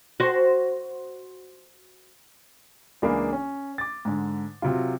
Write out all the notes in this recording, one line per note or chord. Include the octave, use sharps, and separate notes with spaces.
F#4 C5
C#2 E3 A#3 D4 G#4 B5
C#4
D6 A6
G#2 D3
C3 F#3 F4